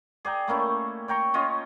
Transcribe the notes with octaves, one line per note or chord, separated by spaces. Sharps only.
G#4 D5 G5 A#5
A3 A#3 C#4 E4
C#5 G5 A#5 C#6
C#4 F4 D#5